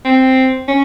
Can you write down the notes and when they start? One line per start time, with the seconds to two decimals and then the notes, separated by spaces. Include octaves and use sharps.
0.05 C4
0.68 C#4